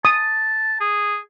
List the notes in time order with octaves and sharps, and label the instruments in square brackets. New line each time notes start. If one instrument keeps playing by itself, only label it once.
[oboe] A5 [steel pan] D#6
[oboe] G#4